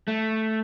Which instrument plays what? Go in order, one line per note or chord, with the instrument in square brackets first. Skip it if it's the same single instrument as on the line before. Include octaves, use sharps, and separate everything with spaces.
[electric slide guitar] A3